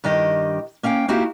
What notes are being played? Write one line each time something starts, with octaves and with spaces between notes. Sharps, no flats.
G2 D#3 G4 D#5
A#3 C#4 F5 G5
A#3 D#4 E4 F#4 G4 F5